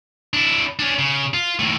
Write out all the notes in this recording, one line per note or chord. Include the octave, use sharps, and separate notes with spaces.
D4 E4
C#4 D4
C#3
F4
D#2 A2